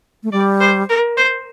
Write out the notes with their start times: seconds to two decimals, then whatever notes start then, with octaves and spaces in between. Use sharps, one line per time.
0.23 A3
0.32 G3 D5
0.61 C5
0.89 A#4
1.17 C5